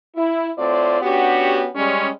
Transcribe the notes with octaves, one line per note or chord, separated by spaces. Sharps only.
E4
A2 C4 F4 D5
B3 C#4 D4 F#4 G4
G3 G#3 C#4